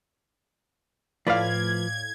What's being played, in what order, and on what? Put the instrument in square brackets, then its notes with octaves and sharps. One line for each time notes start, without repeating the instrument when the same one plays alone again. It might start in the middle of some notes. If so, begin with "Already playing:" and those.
[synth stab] A2 [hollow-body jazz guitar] F3 B4 [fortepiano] D5 F5 [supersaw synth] G#6